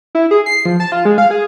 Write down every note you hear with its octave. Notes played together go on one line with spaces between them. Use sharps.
E4
G#4
C7
F3
A5
F4
G#3
F5
G#4